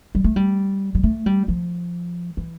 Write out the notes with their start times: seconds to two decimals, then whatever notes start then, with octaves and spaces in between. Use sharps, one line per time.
0.15 G3
0.24 A3
0.36 G3
0.95 G3
1.03 A3
1.26 G3
1.48 F3
2.37 E3